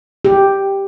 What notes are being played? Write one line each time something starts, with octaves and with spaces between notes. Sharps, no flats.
G4